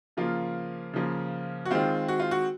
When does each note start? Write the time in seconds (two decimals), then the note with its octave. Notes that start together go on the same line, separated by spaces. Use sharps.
0.17 C#3 F3 A#3 F4
0.93 C#3 F3 A#3
1.65 F#4
1.71 D#3 G#3 C4 F4
2.08 F#4
2.20 F4
2.31 F#4